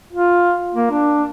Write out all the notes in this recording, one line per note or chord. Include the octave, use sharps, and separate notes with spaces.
F4
A#3
D4